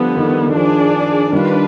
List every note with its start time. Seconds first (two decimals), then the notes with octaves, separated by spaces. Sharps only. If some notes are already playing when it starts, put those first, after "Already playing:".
Already playing: D3 F3 G3 B3
0.17 D#3
0.47 D#3
0.55 F3 D4 G#4 D5
1.32 D#3 G3 D4 F4 B4